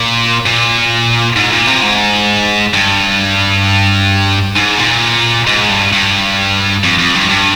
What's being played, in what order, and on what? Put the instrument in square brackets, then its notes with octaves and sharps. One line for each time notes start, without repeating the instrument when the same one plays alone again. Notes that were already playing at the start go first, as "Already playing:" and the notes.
Already playing: [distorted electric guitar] A#2
A#2
G#2
A#2
C3
G#2
G2
G#2
A#2
G#2
G2
G2
F2
F2
G2
G2